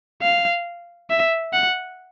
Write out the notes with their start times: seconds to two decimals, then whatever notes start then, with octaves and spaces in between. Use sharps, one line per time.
0.22 F5
1.10 E5
1.53 F#5